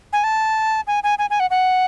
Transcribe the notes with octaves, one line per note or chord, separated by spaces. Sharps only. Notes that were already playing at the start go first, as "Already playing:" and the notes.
G#5
A5
G#5
G#5
G#5
G#5
F#5
F#5